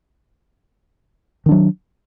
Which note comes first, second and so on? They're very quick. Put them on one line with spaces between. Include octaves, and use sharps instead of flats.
D#3 D4 F#3